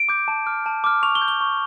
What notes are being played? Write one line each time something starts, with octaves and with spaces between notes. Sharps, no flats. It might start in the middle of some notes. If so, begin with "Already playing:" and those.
Already playing: D7
D6 G6
A5
D6 F6
A5
D6 F6
C#6 F7
G7
G6
G7
C#6